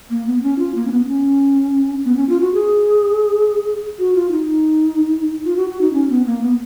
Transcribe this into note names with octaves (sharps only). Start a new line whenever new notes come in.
A#3
B3
C#4
F4
A#3
C#4
B3
C#4
B3
C#4
F4
F#4
G#4
F#4
F4
D#4
F4
F#4
F#4
D#4
C#4
B3
A#3
B3